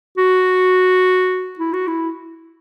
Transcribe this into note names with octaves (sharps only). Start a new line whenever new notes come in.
F#4
E4
F#4
E4